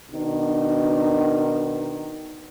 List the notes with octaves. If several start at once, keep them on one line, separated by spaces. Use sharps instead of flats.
B2 D#3 D4 D#4